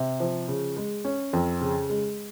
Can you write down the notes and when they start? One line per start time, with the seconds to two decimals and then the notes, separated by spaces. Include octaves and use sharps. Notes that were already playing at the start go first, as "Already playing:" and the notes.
Already playing: C3
0.20 F3
0.48 C#3
0.77 G#3
1.05 C#4
1.33 F2
1.61 C#3
1.90 G#3